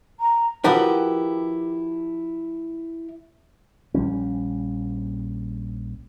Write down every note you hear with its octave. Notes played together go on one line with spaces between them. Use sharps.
A#5
F3 E4 F#4 G4 A#4 B4
A#1 F3 G3 C#4